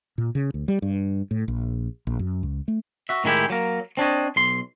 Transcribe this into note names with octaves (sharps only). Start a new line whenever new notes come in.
A#2
C#3
D2
G3
G2
A2
A#1
A#1
F#2
C#2
A3
F#4 E5
A2 D#3 G#3 E4 G4
F#3 A#3 A#4
C4 D4 C#5 D#5
B1 C6